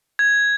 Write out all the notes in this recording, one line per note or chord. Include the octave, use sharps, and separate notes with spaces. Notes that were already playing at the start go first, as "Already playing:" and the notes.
G#6